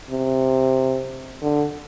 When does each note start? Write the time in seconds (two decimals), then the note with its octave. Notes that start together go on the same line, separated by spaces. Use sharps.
0.11 C3
1.42 D3